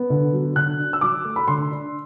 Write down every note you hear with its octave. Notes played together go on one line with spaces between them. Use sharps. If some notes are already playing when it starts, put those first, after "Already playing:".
Already playing: B3
D3
F#3
D3 F#6
D4
E6
F#3 D6
A3
B5
D3 C6
D4